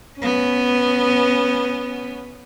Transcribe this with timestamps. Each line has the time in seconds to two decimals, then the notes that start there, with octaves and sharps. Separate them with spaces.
0.20 B3 C#4